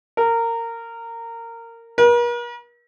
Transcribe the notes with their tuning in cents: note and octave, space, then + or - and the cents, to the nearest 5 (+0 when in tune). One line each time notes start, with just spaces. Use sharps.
A#4 -20
A#4 +45